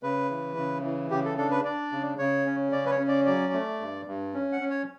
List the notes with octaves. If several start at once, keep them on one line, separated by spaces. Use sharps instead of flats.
C#3 B4
E3
C#3
E3
C#3 G4
A4
D4 A4
B4
D4 D5
C#3
C#3 C#5
C#4
C#3 D5
B4
C#5
C#4
D5
F#3 D5
A3
G2
G2
C#4
F#5
C#4
C#5